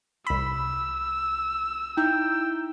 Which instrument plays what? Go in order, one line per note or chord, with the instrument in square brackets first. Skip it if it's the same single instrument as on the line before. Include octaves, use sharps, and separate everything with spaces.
[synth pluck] C2 B5 [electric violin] E6
[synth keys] D#4 E4 A#5 [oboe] G5